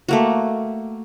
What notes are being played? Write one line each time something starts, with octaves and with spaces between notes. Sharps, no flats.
A3 A#3 F#4